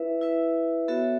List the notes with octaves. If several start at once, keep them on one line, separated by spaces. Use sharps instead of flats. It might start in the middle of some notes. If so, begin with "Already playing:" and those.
Already playing: E4 B4 E5
E4 B4 E5
B3 F#4 A4 C#5 E5